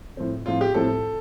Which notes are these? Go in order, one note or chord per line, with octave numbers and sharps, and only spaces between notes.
A2 F3 C4
A2 F3 C4 F4
G4
A2 F3 C4 A4